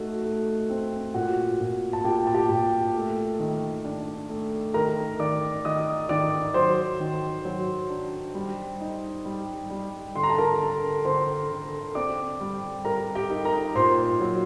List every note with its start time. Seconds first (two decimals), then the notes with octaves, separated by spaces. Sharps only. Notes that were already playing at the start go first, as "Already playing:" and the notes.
Already playing: A3 D#4 F#4
0.24 A3
0.70 C4
1.14 A#2 F#4 F#5
1.60 A#2
1.93 A5
2.04 A#2 G4 G5
2.27 A5
2.34 G4 G5
2.49 A#2
2.95 A3
3.39 D#3
3.85 D4
4.29 A3
4.74 D#3 A#4 A#5
5.19 D#3 D5 D6
5.65 D#3 D#5 D#6
6.09 D#3 D5 D6
6.54 F#3 C5 C6
7.00 D#3
7.45 F#3
7.90 D4
8.34 G3
8.81 D#4
9.25 G3
9.70 G3
10.15 D3 C6
10.23 A#5
10.30 A5
10.38 A#4 A#5
10.60 D3
11.05 D3 C5 C6
11.50 D3
11.95 C4 D5 D6
12.41 G3
12.85 G3 A#4 A#5
13.15 G4 G5
13.30 D#4
13.45 A#4 A#5
13.75 A#2 C5 C6
14.20 F#3